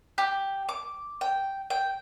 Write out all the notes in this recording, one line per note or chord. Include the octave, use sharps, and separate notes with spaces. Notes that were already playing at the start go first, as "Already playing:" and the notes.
G4
D6
G5
G5